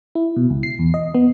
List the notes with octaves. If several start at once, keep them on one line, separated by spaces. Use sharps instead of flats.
E4
B2
C#2
C7
E2
D#5
B3